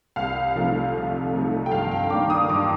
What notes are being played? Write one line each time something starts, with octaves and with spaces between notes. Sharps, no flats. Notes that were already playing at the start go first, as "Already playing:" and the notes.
C2 F5
C3 F3 A3 D#4
C2
C3 F3 A3 D#4
G5
G2 F5
G5
D#3 A#3 D4 D6
D#6
G2 D6